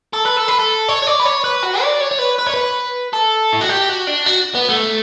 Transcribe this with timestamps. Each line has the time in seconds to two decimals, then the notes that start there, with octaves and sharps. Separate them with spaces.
0.13 A4
0.25 B4
0.37 A4
0.48 B4
0.59 A4
0.88 C#5
1.02 C#5
1.07 D5
1.20 B4
1.25 C#5
1.44 B4
1.63 F#4
1.82 D5
2.01 C#5
2.12 C#5
2.19 B4
2.39 B4
2.47 C#5
2.54 B4
3.14 A4
3.53 E4
3.61 F#4
3.69 G4
3.89 F#4
4.07 D4
4.26 F#4
4.55 B3
4.69 A3